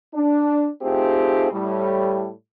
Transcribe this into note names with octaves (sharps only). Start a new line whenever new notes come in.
D4
A3 C4 D#4 F4 G4 G#4
A2 G3